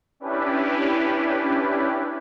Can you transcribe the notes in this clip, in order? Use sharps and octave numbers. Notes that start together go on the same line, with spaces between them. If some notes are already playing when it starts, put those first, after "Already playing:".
C#4 D4 E4 G4 B4